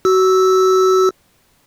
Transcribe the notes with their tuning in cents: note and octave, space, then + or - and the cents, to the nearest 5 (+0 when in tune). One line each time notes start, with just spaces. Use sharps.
F#4 +25 E6 -5